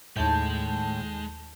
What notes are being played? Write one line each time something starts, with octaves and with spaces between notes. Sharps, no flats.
D#2 A2 G#3 A5 G6